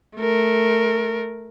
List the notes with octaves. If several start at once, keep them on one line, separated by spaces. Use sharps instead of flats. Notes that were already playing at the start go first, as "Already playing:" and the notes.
A3 A#4